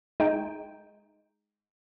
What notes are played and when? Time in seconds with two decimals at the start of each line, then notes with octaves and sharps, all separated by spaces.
0.20 G#3 D#4 G5